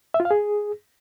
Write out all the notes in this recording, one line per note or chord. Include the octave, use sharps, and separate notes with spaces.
E5
F4
F5
G#4